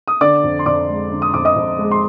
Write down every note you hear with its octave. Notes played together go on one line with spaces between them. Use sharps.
D#6
D3 D5 D6
F2
C6
F2 D5 D6
G#3
D3
D#6
F2 D6
D#5 D#6
F2
G#3
C6